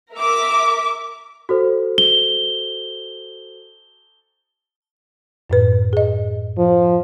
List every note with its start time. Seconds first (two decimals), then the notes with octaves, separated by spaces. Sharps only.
0.13 A#4 E5 D6
1.49 F#4 A4 C5
1.98 G7
5.50 F#2 A2 B4
5.93 G#4 D#5
6.58 F3